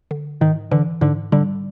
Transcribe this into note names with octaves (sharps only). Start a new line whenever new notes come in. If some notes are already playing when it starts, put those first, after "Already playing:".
D3
G#2 D#3
D3 E3
G#2 D3
D3 G3